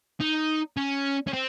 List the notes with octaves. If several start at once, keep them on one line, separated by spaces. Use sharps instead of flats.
D#4
C#4
C#4
C4